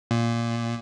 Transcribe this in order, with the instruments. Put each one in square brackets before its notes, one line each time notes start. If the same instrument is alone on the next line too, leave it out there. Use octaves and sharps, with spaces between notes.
[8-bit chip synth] A#2